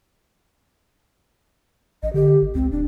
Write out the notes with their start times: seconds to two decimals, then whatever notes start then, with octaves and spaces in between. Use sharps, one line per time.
2.03 A1 D#5
2.14 D3 G4
2.42 G#1
2.55 C#2 C4
2.71 D#1 D4